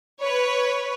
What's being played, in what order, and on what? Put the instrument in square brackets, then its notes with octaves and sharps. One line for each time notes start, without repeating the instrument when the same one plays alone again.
[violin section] B4 C#5